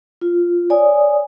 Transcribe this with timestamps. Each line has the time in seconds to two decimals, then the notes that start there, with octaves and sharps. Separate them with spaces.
0.21 F4
0.70 C#5 D5 G#5 D#6